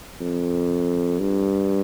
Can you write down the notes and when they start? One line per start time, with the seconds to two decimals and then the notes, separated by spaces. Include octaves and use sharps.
0.21 F2
1.20 G2